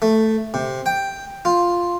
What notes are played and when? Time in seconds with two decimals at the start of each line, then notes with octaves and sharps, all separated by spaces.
0.02 A3
0.54 C3
0.86 G5
1.45 F4